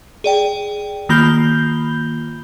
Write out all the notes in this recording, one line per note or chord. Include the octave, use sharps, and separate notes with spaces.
G#4 D5 G5
D#3 A#3 F4 B5 G6 G7